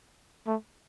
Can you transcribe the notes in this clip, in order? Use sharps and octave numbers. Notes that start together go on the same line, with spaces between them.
A3